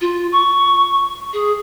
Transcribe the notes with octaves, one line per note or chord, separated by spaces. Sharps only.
F4
C#6
G#4